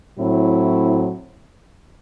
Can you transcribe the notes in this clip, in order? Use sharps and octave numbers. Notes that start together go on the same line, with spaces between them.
A2 F#3 C4 E4